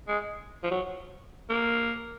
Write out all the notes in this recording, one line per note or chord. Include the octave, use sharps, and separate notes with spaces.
G#3
F3
F#3
A#3